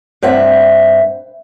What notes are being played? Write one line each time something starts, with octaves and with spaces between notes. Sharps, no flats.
G2 C4 E5 F#5